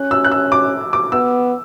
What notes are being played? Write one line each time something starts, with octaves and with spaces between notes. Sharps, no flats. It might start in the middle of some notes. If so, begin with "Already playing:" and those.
Already playing: C#4 F#6
E6
F#6
E6
D6
D6
B3 E6